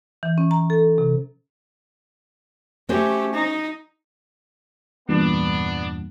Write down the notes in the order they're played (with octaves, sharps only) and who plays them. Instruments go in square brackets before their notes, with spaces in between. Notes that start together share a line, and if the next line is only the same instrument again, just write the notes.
[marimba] E3
C#4
A#5
A4
C3
[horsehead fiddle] A3 G4 [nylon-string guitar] C#4 C5 C#5
[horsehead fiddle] D#4
[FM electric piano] E2 G2 A#2 [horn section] B3 D4